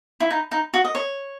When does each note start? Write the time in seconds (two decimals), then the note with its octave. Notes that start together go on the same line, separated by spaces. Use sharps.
0.20 E4
0.31 D#4
0.51 D#4
0.74 F#4
0.84 D#5
0.95 C#5